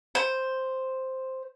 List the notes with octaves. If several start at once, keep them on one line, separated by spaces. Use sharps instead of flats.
C5